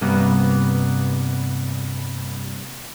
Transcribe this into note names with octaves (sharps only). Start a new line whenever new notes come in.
G2 C3 G3 A#3 B3